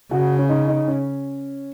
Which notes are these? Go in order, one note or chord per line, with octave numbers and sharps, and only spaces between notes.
C#3 F#4
C#4
D#4
D#4
C#4